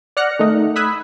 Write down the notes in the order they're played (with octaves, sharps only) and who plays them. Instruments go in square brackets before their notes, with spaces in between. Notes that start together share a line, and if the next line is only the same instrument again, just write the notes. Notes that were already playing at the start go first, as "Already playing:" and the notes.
[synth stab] D5 F#5 F6 F#6 A#6 C#7
D#3 A3 D#4
B5 D#6 E6 F#6 G#6 B6